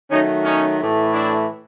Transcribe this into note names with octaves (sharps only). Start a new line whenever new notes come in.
D#3 F#3 A3 C#4 D#4
C#4 D#4
A2 E3 A3
D4 E4